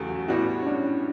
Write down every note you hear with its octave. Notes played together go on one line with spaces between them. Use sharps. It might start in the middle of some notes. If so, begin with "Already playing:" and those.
Already playing: E2 C#3 F#3 A3 G4
F#4
A2 G3 B3 E4 F#4
C#4
D4